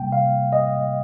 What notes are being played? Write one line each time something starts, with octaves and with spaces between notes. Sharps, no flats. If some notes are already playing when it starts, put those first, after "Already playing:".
Already playing: C3 G3 A#3 G5
F5
D#5